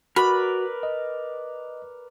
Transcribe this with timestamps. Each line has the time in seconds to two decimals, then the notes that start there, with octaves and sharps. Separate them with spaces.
0.16 F#4 A#4 B4 D5 B5
0.83 D#5